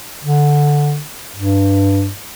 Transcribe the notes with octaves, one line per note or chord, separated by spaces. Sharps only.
D3
G2